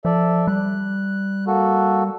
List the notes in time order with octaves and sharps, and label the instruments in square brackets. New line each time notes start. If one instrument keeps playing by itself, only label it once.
[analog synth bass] F3 [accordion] A4 D5 E5
[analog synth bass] G3 [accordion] F#6
[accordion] A#3 F#4 A4